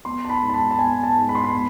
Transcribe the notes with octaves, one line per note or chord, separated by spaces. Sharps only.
B3 C6
A5
B5
G#2
A5
B5
A5
B3 G#5
A5
G#2
B5
C6
B5
B3